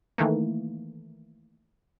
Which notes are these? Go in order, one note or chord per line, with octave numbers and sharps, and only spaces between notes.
D#3 E3 A3 A#3